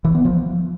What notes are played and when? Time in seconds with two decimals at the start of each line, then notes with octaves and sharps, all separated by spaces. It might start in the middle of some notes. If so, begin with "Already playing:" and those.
0.04 E3
0.15 B3
0.25 F3